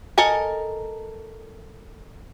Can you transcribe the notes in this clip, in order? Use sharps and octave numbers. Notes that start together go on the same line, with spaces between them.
A4 A#4 D#5 G#5 A#5